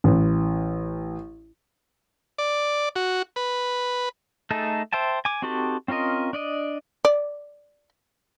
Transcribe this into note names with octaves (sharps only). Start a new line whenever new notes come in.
A1
D5
F#4
B4
A3 D#4 G#4 A4
C5 E5 G5 A5
G#5 D6
C4 D#4 F#4 G4 A4
C4 C#4 F4 A#4 D#5
D4 D5 D#5
D5